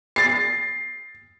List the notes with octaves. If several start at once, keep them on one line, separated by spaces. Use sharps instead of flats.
A6 C7